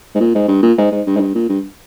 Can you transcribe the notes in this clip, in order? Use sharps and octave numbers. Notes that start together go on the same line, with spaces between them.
G#2
A#2
G#2
G2
A#2
G#2
G#2
G2
G#2
G2
A#2
G2